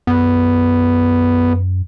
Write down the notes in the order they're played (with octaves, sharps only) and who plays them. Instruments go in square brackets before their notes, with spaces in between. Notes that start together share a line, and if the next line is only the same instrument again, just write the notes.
[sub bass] F#2 [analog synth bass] B3